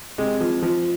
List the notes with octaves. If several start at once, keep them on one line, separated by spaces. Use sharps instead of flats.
C3 G#3
F3
F3